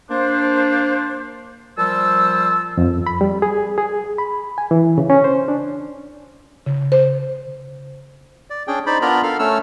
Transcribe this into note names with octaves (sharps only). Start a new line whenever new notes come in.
A#3 D4 C5
A#2 F3 G3 C5 A5 E6
F2
B5
G3
G#4
G#4
B5
G#5
E3
C#3
C#4
C5
D4
C#3
C5
D5
C#4 D4 G#4 G5
D#4 C5 D5 B5
B3 D4 F4 A#4 A#5 B5
A4 A#4 F5 F6
A3 C#4 A4 E6 F6